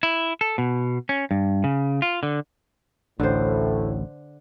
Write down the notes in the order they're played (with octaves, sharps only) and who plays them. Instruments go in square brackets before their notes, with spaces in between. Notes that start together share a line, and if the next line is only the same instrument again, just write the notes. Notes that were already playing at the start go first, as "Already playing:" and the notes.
[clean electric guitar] E4
A4
B2
C#4
G2
C#3
F4
D3
[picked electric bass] A1 D2 [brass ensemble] A2 [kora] D3 C5